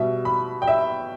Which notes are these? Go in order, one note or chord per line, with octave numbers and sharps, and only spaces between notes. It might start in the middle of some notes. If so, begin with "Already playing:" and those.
Already playing: B2 G3 E5
B5
G5
E5